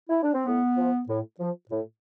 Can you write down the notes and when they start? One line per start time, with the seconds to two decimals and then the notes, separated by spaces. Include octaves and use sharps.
0.09 E4
0.22 D4
0.34 C4
0.46 A2 B3
0.77 F3
1.09 A2
1.40 F3
1.70 A2